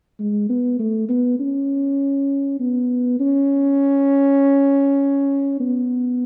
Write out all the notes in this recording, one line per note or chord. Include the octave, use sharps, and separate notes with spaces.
G#3
B3
A3
B3
C#4
B3
C#4
B3